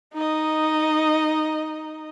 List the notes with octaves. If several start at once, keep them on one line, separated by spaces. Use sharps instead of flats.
D#4 D#5